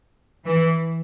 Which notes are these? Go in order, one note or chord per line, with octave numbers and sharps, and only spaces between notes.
E3